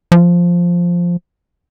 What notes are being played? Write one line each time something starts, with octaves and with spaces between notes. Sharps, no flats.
F3